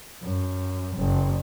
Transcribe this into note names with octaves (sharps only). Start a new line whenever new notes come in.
F#2
F#1